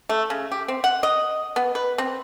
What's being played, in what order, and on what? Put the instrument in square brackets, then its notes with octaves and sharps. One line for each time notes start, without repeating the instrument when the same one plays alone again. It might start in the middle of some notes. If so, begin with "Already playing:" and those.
[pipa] A3
C#3
G4
C4
F#5
D#5
B3
B4
C4